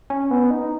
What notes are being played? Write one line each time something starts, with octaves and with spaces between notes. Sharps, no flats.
C#4
B3
D#4